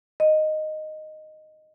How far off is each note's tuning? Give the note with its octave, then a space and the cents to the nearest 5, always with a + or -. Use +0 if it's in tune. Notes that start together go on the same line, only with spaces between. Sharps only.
D#5 -5